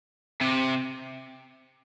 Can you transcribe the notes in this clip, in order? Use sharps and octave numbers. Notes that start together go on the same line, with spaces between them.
C3